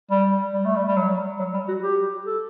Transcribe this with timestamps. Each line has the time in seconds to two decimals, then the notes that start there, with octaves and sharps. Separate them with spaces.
0.11 G3
0.53 G3
0.65 A3
0.76 G3
0.88 G3
0.96 F#3
1.40 F#3
1.54 G3
1.69 F#4
1.83 G4
2.26 A4